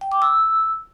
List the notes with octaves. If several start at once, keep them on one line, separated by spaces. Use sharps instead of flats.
G5
D6
E6